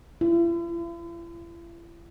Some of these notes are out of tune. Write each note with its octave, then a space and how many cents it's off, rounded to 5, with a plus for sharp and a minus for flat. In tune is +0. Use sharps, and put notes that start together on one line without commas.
E4 +45